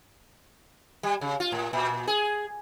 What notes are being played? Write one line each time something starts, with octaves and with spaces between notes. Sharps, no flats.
G3
C#3
F4
A2
A#2
G#4